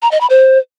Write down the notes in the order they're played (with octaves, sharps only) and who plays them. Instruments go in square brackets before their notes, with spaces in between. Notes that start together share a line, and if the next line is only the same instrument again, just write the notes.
[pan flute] A#5
D#5
B5
C5